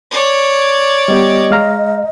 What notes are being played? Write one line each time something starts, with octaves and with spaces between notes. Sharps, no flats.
C#5 D5
G3 B3 G4 D#5
G#3 F5 A#5